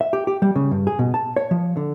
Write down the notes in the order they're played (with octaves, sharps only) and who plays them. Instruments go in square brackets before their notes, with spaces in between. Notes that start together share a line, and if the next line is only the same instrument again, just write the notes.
[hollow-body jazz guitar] E5
G4
G4
G3
C#3
G2
G#4
B2
A5
C#5
F3
D3